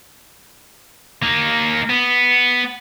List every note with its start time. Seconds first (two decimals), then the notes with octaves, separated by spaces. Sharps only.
1.23 A#3 D#4
1.90 B3